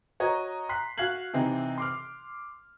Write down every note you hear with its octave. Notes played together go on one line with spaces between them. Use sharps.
F#4 C#5 D#5 A#5
A#5 C6 F#6 B6 C7
F#4 F5 F#6 G#6 C7 F#7
C3 E3 C4 D#4
C6 D6 F6